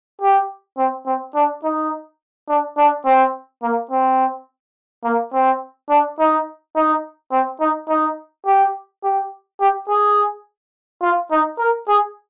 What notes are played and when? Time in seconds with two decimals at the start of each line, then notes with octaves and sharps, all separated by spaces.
0.21 G4
0.78 C4
1.06 C4
1.35 D4
1.64 D#4
2.49 D4
2.78 D4
3.06 C4
3.63 A#3
3.91 C4
5.04 A#3
5.33 C4
5.90 D4
6.19 D#4
6.76 D#4
7.32 C4
7.61 D#4
7.89 D#4
8.47 G4
9.04 G4
9.61 G4
9.89 G#4
11.02 F4
11.32 D#4
11.59 A#4
11.88 G#4